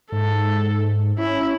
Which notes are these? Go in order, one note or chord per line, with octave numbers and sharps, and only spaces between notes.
G#2 A4
C#4 E4